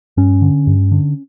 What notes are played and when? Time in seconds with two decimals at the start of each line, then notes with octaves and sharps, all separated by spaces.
0.17 G2 C#4
0.42 D3
0.67 G2
0.92 D3